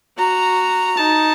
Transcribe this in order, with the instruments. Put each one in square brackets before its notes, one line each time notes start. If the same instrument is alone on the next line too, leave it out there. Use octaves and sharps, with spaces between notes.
[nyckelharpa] F#4 [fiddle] A#5
[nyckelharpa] D#4 [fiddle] A5